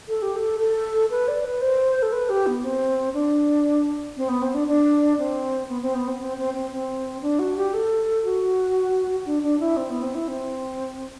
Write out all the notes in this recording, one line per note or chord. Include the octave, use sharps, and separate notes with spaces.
A4
G4
A4
A4
B4
D5
B4
C5
A4
B4
G4
B3
C4
D4
C4
B3
C4
D4
D4
C4
B3
C4
B3
C4
C4
C4
C4
C4
D4
F#4
G4
A4
F#4
D4
D4
E4
C4
B3
C4
E4
C4